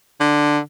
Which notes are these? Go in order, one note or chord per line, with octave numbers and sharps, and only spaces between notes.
D3